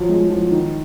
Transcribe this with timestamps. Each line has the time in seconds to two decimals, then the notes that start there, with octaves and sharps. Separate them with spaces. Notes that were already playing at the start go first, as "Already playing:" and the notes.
Already playing: F3 F#3
0.09 G#3
0.30 F3
0.51 D#3